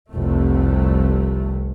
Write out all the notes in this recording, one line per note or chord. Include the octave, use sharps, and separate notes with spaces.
F1 C2 A3